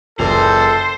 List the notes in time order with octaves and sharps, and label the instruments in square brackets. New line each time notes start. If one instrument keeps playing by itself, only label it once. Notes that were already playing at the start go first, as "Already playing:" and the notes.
[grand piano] F#1 E3 F7 [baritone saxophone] A#2 [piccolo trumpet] A4 [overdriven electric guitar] C5